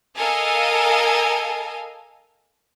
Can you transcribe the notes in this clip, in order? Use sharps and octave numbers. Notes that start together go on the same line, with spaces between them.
A4 A#4 D#5 F5 G#5